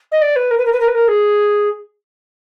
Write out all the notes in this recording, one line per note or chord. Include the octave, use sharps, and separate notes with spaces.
D#5
D5
B4
A#4
B4
A#4
B4
A#4
B4
A#4
G#4